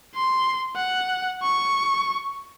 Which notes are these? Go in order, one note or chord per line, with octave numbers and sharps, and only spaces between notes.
C6
F#5
C#6